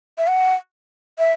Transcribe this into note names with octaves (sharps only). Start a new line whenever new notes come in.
E5
F#5
E5